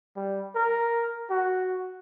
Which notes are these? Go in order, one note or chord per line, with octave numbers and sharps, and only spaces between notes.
G3
A#4
F#4